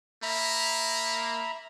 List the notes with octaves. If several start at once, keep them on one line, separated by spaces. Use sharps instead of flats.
A#3 E5 A#5 B5